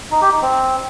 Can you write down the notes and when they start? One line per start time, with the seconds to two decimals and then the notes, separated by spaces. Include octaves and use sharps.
0.11 D#4
0.21 G4
0.32 D#4
0.42 C4